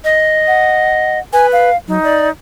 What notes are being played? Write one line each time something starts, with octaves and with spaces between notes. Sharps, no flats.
D#5
F#5
B4 G#5
F5
F#3 D#4
D5